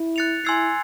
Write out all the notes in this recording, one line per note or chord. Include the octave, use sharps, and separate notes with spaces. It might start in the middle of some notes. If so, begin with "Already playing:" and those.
Already playing: E4
F#6 A6 C#7 F7
E4 G#5 C6 E6 G#6 C7